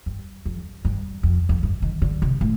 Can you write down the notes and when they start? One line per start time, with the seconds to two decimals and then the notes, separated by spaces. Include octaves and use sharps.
0.06 G2
0.46 F2
0.85 G2
1.23 F2
1.49 F2
1.63 G2
1.82 D#3
2.02 D3
2.22 C3
2.41 A2